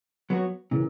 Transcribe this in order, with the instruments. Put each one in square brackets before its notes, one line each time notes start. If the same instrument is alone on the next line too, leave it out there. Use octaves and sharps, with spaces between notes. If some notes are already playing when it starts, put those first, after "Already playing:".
[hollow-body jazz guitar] F#3 B3 F#4 C#5
[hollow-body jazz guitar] A#2 [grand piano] C#3 E3